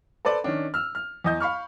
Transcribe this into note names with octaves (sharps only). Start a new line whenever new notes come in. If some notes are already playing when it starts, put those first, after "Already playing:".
A4 B4 C5 D5
D#3 C#4 D4
E6 F6
F6
E2 D#5 G6
F5 B5 C#6 F6